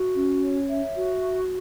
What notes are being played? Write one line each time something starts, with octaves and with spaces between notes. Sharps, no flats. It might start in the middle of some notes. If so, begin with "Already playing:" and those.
Already playing: F#4 E5
C#4
C#5
E5
F#4
C#6